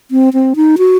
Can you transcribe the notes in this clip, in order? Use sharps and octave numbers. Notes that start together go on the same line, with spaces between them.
C4
C4
D#4
F#4